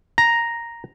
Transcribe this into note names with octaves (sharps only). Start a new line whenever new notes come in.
A#5